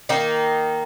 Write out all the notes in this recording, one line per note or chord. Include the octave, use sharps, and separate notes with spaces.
D#3 A#3 D#4